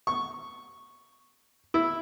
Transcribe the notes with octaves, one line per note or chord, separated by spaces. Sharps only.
C#6
E4